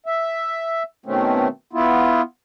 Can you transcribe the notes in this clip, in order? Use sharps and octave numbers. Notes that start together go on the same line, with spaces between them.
E5
B2 D#3 A3 C4 C#4
B3 E4 F4